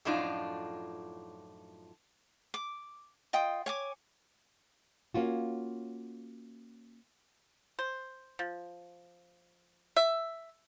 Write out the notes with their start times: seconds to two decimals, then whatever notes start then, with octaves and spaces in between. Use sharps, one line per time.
0.05 F#2 A2 F3 D4 D#4 F4
2.54 D6
3.33 F4 D#5 G5 D#6
3.66 C#5 G#5 D6
5.14 A#3 C#4 F4 F#4
7.79 C5
8.39 F3
9.96 E5